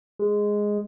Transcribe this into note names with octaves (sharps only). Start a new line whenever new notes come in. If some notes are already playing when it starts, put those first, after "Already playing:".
G#3